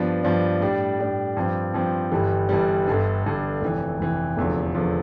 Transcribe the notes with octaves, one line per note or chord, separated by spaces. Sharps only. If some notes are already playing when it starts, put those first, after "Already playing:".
Already playing: G2 F3 B3 D4
G2 F3 B3 D4
A2 G3 D4
A2 G3 D4
G2 F3 C4
G2 F3 C4
G1 G2 E3 G3
G1 G2 E3 G3
G1 G2 D3
G1 G2 D3
F1 F2 E3
F1 F2 E3
F1 E2 D3 F3
E2 D3 F3